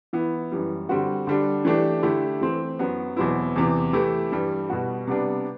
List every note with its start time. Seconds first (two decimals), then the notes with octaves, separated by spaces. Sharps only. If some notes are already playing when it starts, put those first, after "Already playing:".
0.13 E3 B3 E4
0.51 F#2 E3 G3
0.89 D3 G3 C4 F#4
1.27 D3 G3 D4
1.65 E3 A3 D4 G4
2.03 D3 A3 E4 G4
2.41 E3 A3 C4
2.79 F#2 F#3 B3
3.17 E2 B2 F#3 C4 E4
3.56 E2 C3 E3
3.93 E3 A3 E4 G4
4.32 G2 E3 G3
4.70 B2 G3 B3 F#4
5.07 C3 G3 B3 D4